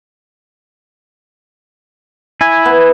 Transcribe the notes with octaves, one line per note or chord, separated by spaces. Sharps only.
E4 G#5
B3